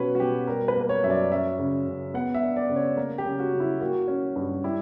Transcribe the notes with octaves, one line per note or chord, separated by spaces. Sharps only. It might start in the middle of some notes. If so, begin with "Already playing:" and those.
Already playing: B2 C#4 B4 C#5
F#4
B2 G4
G3 A#4
B4
A#3
B4
C#5
F#2 E5
D5
C#4 E5
C#3
C#3
B3 F#5
E5
D4
D5
C#3
C#5
A#3 A#4
G4
C#3
F#4
C#3
E4
A#3 F#4
C#4
G2
G3 E4